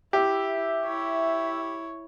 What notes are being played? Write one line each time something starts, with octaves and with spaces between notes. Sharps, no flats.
E4 G4 E5
E4 C#5